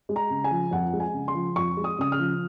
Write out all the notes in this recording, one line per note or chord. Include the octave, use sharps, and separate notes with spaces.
G#3
A#5
C#3
G#5
F3
F2 F#5
G#3
G#5
C#3
C6
F3
F2 C#6
G#3
D#6
C#3 D#6
F6
F3